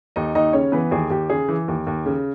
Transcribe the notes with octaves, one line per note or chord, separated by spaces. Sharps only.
D#2 D#4 D#5
D#2 D#4 D#5
C#3 C#4 C#5
E3 B3 B4
D#2 G#4
D#2 G4
C#3 G#4
E3
D#2
D#2
C#3